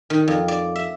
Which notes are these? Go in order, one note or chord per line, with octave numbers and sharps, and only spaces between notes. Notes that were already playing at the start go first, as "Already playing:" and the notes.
D#3
F2
D5
E5